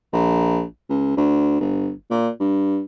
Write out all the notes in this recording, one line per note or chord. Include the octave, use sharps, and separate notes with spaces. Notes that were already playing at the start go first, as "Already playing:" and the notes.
A#1
C#2
D2
G1
A#2
G2